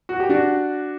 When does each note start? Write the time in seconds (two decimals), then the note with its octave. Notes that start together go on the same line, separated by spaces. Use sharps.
0.09 F#4
0.20 G4
0.29 D4 F#4